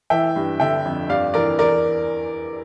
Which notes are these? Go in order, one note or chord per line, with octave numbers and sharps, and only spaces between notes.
E3 E5 G5
G2
D3 E5 G5
F2
G2 D5 F5
E3 A#4 D5
E2 A#4 D5